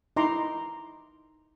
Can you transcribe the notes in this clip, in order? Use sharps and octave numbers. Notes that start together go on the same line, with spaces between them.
D#4 E4 A#5 C6 D6